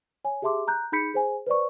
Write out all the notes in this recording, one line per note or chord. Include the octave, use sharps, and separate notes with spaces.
C#5 G#5
G4 G#4 E5 A5 C6 D6
A#5 F#6 G6
D#4 G#4 B5 G6 B6 C#7
G#4 C5 G#5
B4 C5 D5 C#6